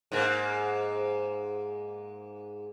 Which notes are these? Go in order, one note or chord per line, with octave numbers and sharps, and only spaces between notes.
G#2 A#3